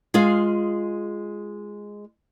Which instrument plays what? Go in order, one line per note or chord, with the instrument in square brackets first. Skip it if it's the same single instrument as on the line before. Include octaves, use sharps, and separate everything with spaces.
[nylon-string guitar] G#3 F4 G#4 F5